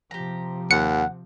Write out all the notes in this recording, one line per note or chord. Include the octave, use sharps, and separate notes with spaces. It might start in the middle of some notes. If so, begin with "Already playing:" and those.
C3 F3 G4 A#5
D#2 F#5 C#7